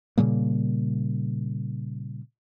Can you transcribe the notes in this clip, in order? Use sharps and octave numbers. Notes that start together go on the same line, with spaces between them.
A#2 C#3 G3 A#3